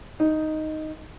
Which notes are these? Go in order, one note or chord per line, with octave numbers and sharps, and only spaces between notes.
D#4